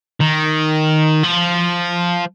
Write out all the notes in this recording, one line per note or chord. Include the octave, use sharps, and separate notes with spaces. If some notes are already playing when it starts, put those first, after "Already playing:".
D#3
F3